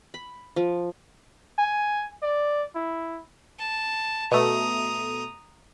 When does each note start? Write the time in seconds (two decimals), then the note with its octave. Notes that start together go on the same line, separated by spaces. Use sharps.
0.14 B5
0.56 F3
1.58 G#5
2.22 D5
2.75 E4
3.59 A5
4.31 B2 A3 A#5 D#6